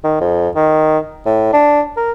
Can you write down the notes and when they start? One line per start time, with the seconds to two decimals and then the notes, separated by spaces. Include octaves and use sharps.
0.04 D#3
0.21 F2
0.55 D#3
1.26 A2
1.53 D4
1.96 A#4